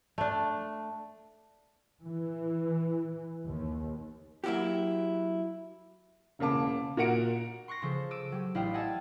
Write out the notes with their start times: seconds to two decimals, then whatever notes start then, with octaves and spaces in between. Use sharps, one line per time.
0.18 A3 D4
2.02 E3
3.45 D#2
4.44 F#3 A#3 E4 F#4 G4
6.39 E1 C#3 A#3 A5 D6
6.97 A#2 F#4 A#4 F#5 C#7 D7
7.68 C6 C#6 F#6 A#6
7.82 C#3 F3 A4 C5
8.11 D6 E6 D7 D#7
8.32 F#3 G4
8.55 A1 E4 D5 F5 G5 D#6
8.74 D5 D#5 F#5 G#5 A5 E6